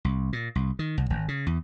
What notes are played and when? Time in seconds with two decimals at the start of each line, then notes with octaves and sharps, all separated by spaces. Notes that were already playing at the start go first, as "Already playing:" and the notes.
0.05 C2
0.33 A#2
0.55 C2
0.79 D#3
0.98 C2
1.10 G#1
1.28 C#3
1.47 E2